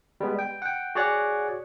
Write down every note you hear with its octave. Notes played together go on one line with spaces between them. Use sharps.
G3 G#3 B3
G5
F#5 G5
F#4 G#4 C#5 D5 F#5